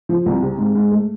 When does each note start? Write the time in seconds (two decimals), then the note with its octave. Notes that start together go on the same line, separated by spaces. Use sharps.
0.09 F3
0.26 C2
0.42 C3
0.58 G#2
0.75 G#2
0.91 A3